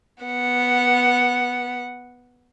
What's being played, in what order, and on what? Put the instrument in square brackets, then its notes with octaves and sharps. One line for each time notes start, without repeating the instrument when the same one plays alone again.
[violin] B3 F#5